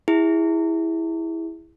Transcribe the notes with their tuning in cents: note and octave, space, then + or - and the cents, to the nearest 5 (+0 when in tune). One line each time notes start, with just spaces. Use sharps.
E4 -5 G#4 -20